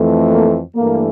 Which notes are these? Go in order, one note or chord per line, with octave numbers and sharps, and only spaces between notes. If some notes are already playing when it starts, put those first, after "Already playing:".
Already playing: F2 E3 A3
A#3
G2 E3 A3 A#3